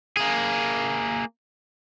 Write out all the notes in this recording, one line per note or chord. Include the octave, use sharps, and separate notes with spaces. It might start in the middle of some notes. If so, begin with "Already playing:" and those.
A#3 G#4